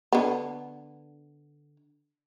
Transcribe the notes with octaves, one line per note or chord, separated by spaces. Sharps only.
D3 B3